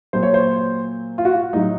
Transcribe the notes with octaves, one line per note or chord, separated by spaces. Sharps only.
A#2 F#3 C5
C#5
C5
F4
F#4
F4
A2 F#3 D#4